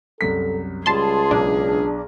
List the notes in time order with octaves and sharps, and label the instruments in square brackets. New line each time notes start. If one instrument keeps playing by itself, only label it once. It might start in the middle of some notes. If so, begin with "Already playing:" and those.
[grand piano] C2 F#2 B6 [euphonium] A4
[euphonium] C#2 [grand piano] G3 [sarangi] G#4 [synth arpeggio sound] A5 C6
[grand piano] B1 [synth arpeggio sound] D4